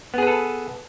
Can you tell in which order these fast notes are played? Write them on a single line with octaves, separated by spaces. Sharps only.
B3 G#4 B4 A4